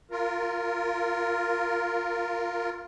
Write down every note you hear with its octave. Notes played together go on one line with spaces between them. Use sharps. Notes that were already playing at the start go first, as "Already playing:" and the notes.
F4 A#4